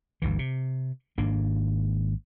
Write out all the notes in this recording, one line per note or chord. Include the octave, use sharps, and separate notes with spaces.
G1 D2 E3
C3
G#1 G#2 A#3 D4